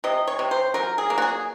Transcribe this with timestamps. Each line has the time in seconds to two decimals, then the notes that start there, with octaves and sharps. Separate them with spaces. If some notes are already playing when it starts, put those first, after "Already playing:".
0.04 C3 D#5
0.27 C#5
0.39 C3
0.51 C5
0.74 F#3 A#4
0.98 G#4
1.10 A#3
1.18 F#4
1.22 G#4